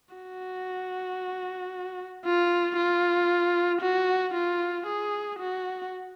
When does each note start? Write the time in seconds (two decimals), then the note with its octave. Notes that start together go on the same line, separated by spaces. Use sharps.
0.15 F#4
2.24 F4
2.77 F4
3.81 F#4
4.34 F4
4.86 G#4
5.39 F#4